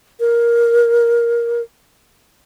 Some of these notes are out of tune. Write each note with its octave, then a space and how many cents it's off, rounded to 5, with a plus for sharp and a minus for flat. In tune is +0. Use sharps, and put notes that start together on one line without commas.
A#4 +10